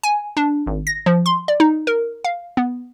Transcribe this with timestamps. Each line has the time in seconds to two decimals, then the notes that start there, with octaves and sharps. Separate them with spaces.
0.03 G#5
0.37 D4
0.67 G#1
0.87 A#6
1.06 F3
1.26 C6
1.48 D5
1.60 D#4
1.87 A#4
2.24 F5
2.57 B3